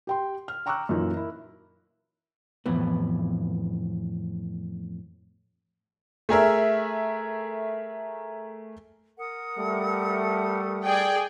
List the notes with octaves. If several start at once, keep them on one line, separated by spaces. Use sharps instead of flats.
G4 G5 C6
F6
G5 A#5 C#6 D6 E6 F#6
F#2 A#2 E3 D#4
E4 A#4
F2 A2 E3 B3
A3 G#4 A#4 E5
A#4 F#5 D#6
G3 A3
G#4 D5 G5